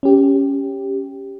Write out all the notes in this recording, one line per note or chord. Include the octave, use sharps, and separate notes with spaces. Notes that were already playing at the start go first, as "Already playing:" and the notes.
C#4 G4